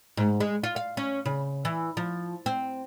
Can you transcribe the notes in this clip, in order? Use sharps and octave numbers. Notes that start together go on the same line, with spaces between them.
G#2
G#3
F4
F5
C#4
C#3
E3
F3
C4